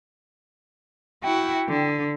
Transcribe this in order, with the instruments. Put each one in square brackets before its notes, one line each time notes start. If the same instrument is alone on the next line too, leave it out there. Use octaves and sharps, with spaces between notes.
[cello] E4 F#4 [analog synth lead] G5
[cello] D3